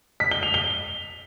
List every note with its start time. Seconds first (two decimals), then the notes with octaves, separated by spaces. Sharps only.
0.20 B6
0.31 G7
0.43 F7
0.54 G7